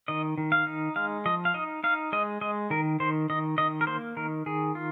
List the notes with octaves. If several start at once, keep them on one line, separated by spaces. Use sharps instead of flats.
D#3 D#5
D#3
F5
D#4
G#3 F5
F3 D#5
F5
D#4 D#5
D#4 F5
G#3 D#5
G#3 D#5
D#3 A#4
D#3 C5
D#3 D#5
D#3 D#5
A#4
A#3 C5
D#3 A#4
D#3 G#4
F4